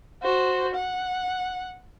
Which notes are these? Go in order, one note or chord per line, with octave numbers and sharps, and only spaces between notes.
F#4 C5
F#5